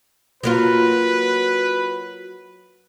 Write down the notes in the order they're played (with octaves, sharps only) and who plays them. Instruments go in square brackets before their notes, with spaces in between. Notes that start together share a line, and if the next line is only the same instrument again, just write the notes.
[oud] F#3 A#3 F4 [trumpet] B4